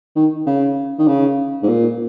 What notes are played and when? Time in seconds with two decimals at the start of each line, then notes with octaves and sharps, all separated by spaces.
0.16 D#3
0.47 C#3
0.99 D#3
1.08 C#3
1.63 G#2
1.69 A#2